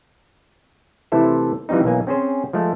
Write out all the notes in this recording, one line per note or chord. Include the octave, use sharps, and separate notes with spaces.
C3 E3 A3 E4 A4 C5
E3 F3 G3 C4 D#4
B1 E3 A#3 G#5
C4 C#4 G#4 C5
F3 G#3 A3